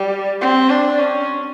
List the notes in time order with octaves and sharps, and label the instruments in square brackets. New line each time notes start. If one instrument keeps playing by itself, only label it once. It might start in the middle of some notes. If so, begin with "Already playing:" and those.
Already playing: [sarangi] G3
C4
D4
C#4